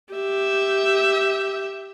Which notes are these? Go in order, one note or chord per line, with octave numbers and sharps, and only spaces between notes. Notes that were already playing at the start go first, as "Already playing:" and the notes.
G4 E5